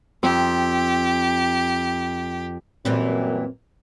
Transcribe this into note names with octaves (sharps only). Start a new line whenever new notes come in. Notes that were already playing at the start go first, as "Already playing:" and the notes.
F2 G4
F#2 A#2 E3 G3 C4